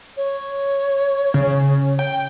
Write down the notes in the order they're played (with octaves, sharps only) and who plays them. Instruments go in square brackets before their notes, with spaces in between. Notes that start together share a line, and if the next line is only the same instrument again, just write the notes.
[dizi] C#5
[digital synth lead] C#3
G5